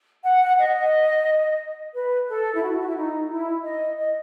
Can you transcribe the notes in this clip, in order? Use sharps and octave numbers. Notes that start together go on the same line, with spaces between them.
F#5
F#5
D#5
B4
A4
E4
F#4
F#4
E4
D#4
E4
D#5
D#5